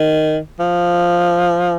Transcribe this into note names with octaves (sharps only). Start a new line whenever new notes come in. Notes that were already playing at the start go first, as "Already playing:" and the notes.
Already playing: D#3
F3